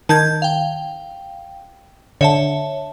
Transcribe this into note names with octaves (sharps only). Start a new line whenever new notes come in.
D#3 A5 G6 G#6
F5 G5
D3 C#5 E5 A5